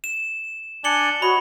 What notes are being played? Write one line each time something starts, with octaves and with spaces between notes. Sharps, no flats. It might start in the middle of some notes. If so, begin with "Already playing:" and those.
E7
D4 D5 G#5 C#7 F#7 G7
F#4 C#5 D#5 B5